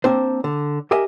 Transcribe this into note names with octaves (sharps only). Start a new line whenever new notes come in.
A#3 C4 D4 C5
D3
G4 A#4 D#5 E5 G#5